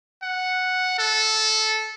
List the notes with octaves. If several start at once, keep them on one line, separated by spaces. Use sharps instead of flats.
F#5
A4